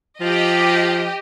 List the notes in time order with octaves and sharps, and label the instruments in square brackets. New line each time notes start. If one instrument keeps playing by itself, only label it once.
[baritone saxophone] F3 [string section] G4 D#5